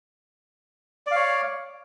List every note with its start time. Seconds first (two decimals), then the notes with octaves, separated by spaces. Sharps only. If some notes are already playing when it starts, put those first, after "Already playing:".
1.07 D5
1.11 F5
1.16 C#5